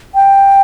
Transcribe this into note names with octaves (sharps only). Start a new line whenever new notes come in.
G5